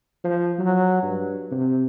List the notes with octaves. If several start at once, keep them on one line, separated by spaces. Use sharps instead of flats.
F3
F#3
G2
C3